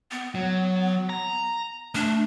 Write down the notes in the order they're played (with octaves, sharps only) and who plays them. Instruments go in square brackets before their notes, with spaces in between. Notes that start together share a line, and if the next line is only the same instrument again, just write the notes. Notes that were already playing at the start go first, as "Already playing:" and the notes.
[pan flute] B3
[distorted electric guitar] F#3
A#5
[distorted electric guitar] A3 [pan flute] D4